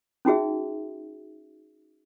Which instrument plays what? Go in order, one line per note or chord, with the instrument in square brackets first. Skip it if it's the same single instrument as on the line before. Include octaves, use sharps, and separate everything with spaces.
[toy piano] C#4 D#4 F#4 G#4 E5